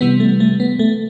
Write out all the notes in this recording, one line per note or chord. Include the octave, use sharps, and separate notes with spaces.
C3 E3 G3 B3
A3
A3
B3
A3